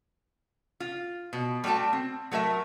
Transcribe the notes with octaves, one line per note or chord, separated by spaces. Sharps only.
F4
B2
G3 A3 F#4 G5 A5
C4
F#3 A3 A#4 E5